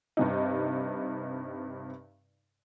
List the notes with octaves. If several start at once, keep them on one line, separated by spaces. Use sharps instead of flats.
G2 C3 D#4